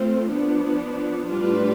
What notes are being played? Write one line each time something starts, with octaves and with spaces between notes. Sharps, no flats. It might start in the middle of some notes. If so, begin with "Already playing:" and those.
Already playing: A3 C4 F4 C5
F3 B3 D4
A2 G3 D4 F4 B4